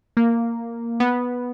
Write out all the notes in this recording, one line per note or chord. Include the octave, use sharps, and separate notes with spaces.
A#3
B3